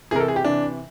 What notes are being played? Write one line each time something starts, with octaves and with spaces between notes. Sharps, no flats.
C3 E3 G#4 A#4
A4
G#4
G4
C3 E3 D4